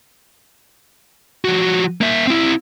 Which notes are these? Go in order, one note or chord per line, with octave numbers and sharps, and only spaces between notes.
F3 F#4
A#3 E5
C4 E4